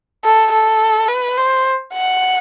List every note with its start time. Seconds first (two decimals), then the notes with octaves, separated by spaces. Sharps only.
0.24 A4
0.52 A4
1.08 B4
1.37 C5
1.94 F#5